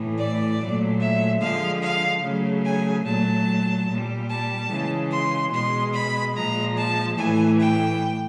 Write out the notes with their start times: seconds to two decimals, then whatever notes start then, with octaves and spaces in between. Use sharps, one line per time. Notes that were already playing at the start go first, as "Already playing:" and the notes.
Already playing: A2 E3 A3
0.16 D5
0.58 A#2 F#3 A3
0.99 E5
1.40 D3 F3 G#3 F5
1.81 F5
2.23 C#3 F#3 A3
2.64 G#5
3.05 A#2 F#3 A3 A5
3.88 A#2 G3
4.28 A5
4.71 C#3 E3 G#3
5.11 C6
5.52 B2 G#3 C6
5.93 B5
6.35 A#2 F3 G#3 A#5
6.76 A5
7.17 A2 E3 A3 G#5
7.58 G5